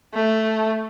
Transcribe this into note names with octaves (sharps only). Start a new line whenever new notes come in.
A3